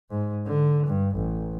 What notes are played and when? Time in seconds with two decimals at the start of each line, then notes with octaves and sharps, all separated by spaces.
0.11 G#2
0.46 D3
0.87 G2
1.16 A1